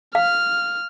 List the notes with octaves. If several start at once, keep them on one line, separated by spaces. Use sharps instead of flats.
F5 F6